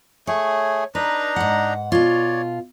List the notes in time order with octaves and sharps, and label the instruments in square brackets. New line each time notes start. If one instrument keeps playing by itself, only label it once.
[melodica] A3 G#4 [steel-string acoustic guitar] C#5
[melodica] D4 D#4 A#5 [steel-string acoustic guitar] B4
[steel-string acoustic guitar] G#2 F#5
[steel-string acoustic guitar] B2 F4 [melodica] C#5 D5